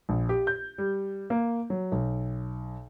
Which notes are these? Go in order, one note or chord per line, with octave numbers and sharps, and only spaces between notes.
A#1
G4
G6
G3
A#3
F#3
B1